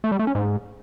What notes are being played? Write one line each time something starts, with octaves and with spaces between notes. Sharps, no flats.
A3
G3
A3
C#4
G#2